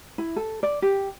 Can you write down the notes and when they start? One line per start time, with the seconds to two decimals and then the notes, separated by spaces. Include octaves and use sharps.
0.18 E4
0.36 A4
0.63 D5
0.82 G4